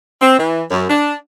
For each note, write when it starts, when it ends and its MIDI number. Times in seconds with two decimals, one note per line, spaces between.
0.21 0.36 60
0.39 0.64 52
0.71 0.87 42
0.90 1.16 62